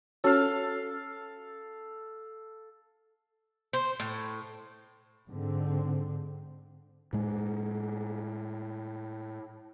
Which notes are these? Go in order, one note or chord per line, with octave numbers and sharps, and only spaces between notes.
C#4 F#4 A4 C#5 F5
C5
A2
G#2 D3 C4
A2 G#3